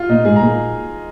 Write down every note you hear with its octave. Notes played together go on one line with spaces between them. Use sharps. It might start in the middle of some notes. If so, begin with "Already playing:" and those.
Already playing: F4
A#2 D#4
G#2 G#4
A#5
A#2